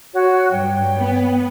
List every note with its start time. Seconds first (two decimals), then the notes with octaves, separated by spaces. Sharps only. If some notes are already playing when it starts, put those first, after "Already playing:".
0.13 F#4 C#5
0.51 G2 C#5 G5
0.99 B3